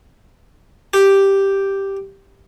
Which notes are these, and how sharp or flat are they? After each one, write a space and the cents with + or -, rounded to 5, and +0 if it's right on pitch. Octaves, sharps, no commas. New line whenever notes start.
G4 +0